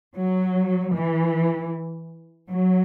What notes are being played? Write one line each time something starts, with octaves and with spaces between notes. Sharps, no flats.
F#3
E3
F#3